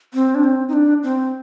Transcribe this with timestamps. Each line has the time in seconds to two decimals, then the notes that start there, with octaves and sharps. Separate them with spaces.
0.14 C4
0.35 D4
0.43 C4
0.69 D#4
0.73 D4
1.03 C4